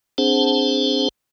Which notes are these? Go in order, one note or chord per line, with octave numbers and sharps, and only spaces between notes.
C4 D4 G#4 C5 F#5 A5